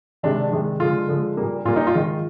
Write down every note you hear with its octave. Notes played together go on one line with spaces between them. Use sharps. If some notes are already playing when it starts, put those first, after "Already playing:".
C3 D#3 G#3 D4
C3 D#3 G#3
D3 F3 G#3 F4
D3 F3 G#3
A#2 G3 A#3
A#2 G3 A#3 F4
D#4
F4
D#3 G#3